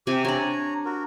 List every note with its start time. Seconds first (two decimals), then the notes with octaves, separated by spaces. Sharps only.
0.07 C3 G4 G#5
0.25 D4 C#5 G#5 A#5
0.85 F#4 A#4